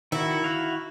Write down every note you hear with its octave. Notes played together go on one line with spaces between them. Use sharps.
D#3 E4 F#4
F#4 F5